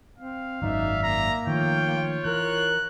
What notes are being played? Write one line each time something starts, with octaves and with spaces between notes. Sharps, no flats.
C4 F5
G#1 F#2 D#3 D#4 D5 E5
A#3 A#5
D#3 F3 A3 F4 C#5 G5
E3 A#4 F#6